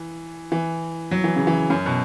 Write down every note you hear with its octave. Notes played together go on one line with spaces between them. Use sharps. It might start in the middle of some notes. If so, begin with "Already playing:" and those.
Already playing: E3
E3
F#3
E3
C#3
E3
F#2
B2